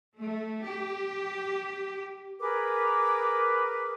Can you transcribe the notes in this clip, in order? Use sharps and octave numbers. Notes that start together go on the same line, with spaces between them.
A3
G4
G#4 A#4 B4 D6